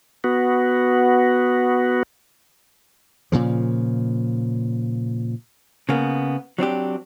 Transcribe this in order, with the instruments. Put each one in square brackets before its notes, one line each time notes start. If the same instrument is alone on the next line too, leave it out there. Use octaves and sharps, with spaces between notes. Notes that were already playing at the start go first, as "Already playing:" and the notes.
[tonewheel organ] B3 F#4
[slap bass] A#2 C#3 F3
[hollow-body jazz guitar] C#3 A#3 B3
F#3 C4 D4 G4